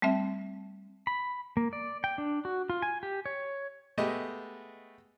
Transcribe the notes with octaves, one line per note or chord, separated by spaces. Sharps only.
G3 A3 C4 E5
B5
A#3
D5
G5
D4
F#4
F4
G#5
G4
C#5
G#3 A3 B3 G4 D#5